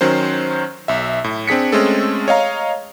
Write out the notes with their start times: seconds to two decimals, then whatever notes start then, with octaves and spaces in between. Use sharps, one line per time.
0.01 D#3 F#3 C#4 C5
0.88 B1 E5
1.24 A2
1.47 C4 D4 G#4 B6 C#7
1.72 G#3 A3 C4 C#4 G#4 A4
2.28 C#5 D#5 F5 A#5